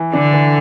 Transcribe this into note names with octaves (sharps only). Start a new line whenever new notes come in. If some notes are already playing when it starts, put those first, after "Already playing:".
Already playing: E3
D3 D4
E3